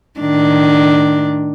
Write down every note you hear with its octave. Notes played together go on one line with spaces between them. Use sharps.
A2 D#3 D4